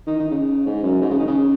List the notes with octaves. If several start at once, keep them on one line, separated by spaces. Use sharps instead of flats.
D#3
D#3
C#3
G#2
F#2
G#2
C#3
D#3
C#3